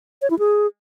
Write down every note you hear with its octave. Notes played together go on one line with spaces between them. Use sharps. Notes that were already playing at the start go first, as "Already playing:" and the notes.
C#5
E4
G#4